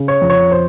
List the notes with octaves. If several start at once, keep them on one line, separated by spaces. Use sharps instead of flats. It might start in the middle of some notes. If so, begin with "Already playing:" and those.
Already playing: C#3
C#5
F2
C#5
C5